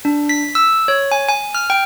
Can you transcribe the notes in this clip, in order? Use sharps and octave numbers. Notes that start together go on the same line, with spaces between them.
D4
B6
E6
C#5
G#5
G#5
F6
G5